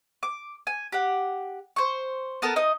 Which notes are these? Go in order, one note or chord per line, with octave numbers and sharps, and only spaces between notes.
D6
G#5
G4 F#5
C5 C#6
B3 A4 A#4
D#4 D#5